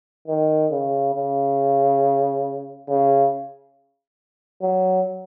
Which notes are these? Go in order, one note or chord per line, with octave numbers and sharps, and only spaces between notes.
D#3
C#3
C#3
C#3
F#3